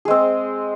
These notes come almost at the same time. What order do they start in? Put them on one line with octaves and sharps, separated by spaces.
G#4 G#3 C4